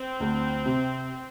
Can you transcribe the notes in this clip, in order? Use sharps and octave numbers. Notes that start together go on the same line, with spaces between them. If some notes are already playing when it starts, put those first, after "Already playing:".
Already playing: C4
D2
C3